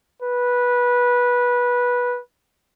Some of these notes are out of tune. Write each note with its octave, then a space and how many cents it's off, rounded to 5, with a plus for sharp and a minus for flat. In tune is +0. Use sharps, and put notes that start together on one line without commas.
B4 -15